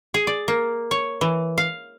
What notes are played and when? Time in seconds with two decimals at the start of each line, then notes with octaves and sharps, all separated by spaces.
0.14 G#4
0.27 D5
0.48 A#3
0.91 C#5
1.21 E3
1.58 F5